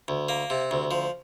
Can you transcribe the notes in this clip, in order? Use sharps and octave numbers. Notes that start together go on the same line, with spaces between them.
D2
A#3
C3
D2
F3